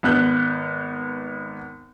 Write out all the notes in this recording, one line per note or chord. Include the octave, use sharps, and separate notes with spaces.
G#1 B3 F#6 G6